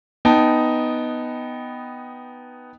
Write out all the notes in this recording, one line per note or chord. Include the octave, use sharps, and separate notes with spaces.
B3 D#4 G5 A5